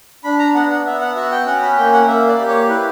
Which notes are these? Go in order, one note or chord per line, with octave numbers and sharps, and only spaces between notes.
D4 B5
A#5
B3 F#5
F#5
B3 E5
F#5
F#4 E5
G5
C#4 F#5
B5
A#3 G5
F#5
A#3 E5
D5
G4
C#5
E4 B4